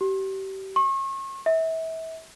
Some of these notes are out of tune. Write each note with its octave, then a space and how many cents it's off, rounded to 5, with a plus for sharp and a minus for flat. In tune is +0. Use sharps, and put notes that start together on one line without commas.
G4 -30
C#6 -40
E5 -30